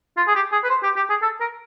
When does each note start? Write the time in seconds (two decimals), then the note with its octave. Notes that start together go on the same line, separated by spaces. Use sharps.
0.17 F4
0.28 G#4
0.35 G4
0.52 G#4
0.64 B4
0.70 C5
0.83 G4
0.96 G4
1.10 G#4
1.22 A4
1.41 A#4